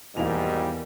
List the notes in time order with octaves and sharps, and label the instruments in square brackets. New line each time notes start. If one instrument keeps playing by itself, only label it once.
[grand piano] E2 F7 [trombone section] G#2 D#3 G3 [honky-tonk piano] B2 E3 A#3